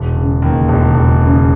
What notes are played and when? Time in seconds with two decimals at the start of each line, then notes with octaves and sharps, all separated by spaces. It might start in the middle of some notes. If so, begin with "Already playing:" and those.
Already playing: E1
0.15 C#3
0.42 D#2
0.68 E1
0.94 E1
1.20 C#3